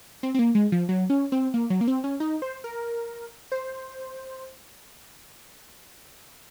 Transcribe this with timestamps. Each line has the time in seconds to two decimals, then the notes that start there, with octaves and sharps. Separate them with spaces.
0.23 C4
0.34 C4
0.39 A#3
0.55 G#3
0.72 F3
0.89 F#3
1.10 C#4
1.32 C4
1.54 A#3
1.70 F#3
1.81 A#3
1.88 C4
2.04 C#4
2.20 D#4
2.42 C5
2.64 A#4
3.52 C5